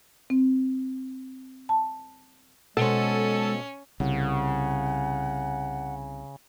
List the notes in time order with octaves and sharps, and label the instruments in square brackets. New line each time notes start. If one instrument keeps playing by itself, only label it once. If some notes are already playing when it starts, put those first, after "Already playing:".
[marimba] C4
A5
[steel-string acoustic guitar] B2 C5 [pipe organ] G#3 [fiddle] C#4 [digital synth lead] A4
[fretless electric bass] C2 [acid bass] C#3 [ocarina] F#5